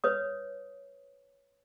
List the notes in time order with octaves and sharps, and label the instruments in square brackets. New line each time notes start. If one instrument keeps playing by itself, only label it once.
[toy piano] B4 C#5 D#6